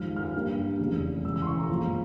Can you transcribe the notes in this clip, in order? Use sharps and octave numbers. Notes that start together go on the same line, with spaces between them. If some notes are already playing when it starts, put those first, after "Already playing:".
Already playing: G#1 G#2 F3 F6
F6
G2 G3 A#3
F1 E2 C#3
E1 E2 C#3 E3 E6
E6
C6
C#6
A#5
A#1 A#2 F3 G#3